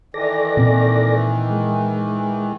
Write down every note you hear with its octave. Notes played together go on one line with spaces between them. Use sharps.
D#3 E3 A4 D5 A#6
A#2 C4
G#3